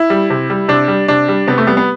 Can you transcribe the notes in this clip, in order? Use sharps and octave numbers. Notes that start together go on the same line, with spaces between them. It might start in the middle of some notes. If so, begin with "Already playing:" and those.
Already playing: E4
G3
C3
G3
C3 D4
G3
C3 D4
G3
C3 B3
A3
G3 B3
B3